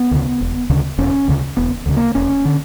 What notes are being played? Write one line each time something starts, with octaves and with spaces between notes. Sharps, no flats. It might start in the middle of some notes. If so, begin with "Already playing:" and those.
Already playing: B3
D2 C#3
E1
D2 C#3
E1 C#4
D2 C#3
E1 B3
D2 C#3
A#3
E1 C#4
D3